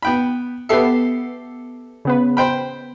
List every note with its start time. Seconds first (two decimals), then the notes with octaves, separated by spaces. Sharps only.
0.02 B3 G5 B5
0.69 B3 G4 A4 E5 C7
2.05 C#3 B3 B4
2.37 C5 G5 B5